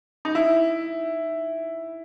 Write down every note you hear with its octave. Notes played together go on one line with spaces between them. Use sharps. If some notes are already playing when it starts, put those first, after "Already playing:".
D#4
E4